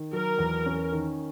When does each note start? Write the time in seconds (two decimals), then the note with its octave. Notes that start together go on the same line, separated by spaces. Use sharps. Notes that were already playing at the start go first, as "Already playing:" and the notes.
Already playing: D#3
0.13 F#3 A#4
0.39 E2
0.66 C#4
0.92 D#3